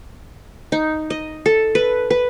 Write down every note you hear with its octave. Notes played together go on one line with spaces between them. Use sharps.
D#4
D#5
A4
B4
B4